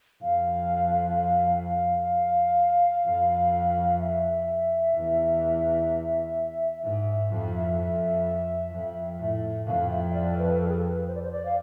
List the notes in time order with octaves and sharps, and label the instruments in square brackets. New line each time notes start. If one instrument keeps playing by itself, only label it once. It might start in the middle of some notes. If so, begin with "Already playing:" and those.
[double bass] F2 [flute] F5
[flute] F5
F5
[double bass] F2
[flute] E5
[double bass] E2
[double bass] G#2 [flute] E5
[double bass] F2
F2
F2
A2
[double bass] F2 [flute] F5
[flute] E5
D5
B4
A4
G#4
A4
B4
C5
D5
C5
D5
F5